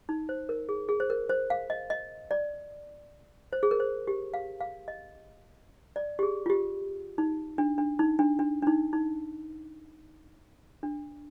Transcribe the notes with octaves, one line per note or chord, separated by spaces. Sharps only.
D#4
C5
A#4
G#4
G#4
C5
A#4
C5
F5
D#5
D#5
D5
C5
G#4
A#4
C5
G4
F5
F5
D#5
D5
G4
G#4
F4
G4
D#4
D4
D4
D#4
D4
D4
D4
D#4
D#4
D4